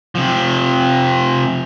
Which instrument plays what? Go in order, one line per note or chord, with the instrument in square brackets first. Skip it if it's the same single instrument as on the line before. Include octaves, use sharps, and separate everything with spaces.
[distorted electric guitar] C3 F3